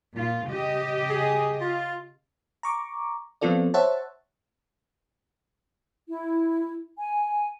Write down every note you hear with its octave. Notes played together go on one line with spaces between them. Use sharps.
A#2 F4
C#3 G4 D#5
G#4
F4
A#5 C#6 D6
F3 B3 C4 F4 A4 D5
C5 C#5 E5 F#5 A5
E4
G#5